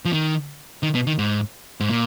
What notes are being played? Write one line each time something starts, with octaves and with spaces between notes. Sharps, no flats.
F3
D#3
D#3
B2
D#3
G#2
G#2
A#2